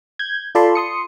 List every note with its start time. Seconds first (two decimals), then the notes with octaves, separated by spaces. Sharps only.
0.19 G6 G#6
0.55 F4 A4 D5 A5 B5 C6
0.75 C6 D#6 C#7